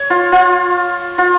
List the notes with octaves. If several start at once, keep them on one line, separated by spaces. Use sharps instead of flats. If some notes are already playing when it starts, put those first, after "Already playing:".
Already playing: C#5
F4
F4
F4